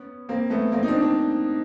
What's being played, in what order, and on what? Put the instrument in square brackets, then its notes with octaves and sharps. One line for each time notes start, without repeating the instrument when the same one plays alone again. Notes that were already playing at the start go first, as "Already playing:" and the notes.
Already playing: [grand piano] B3 C#4
A#3 C4
A3 B3
A#3 C4
D#4
C4 D4
C4 D4